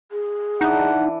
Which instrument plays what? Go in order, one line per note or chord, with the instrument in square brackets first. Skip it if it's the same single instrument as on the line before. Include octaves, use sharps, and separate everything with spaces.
[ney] G#4
[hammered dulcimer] E3 D4 [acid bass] D#4 [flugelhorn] F#5